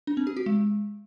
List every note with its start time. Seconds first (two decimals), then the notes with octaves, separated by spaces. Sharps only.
0.07 D4
0.17 C4
0.27 G4
0.37 F#4
0.46 G#3